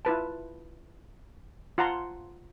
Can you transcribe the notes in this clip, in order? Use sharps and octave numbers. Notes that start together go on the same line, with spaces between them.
E4 F4 B4 A5
F4 F#5 A5 A#5 C6